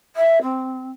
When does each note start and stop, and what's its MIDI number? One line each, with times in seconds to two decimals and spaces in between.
0.16 0.38 76
0.42 0.91 60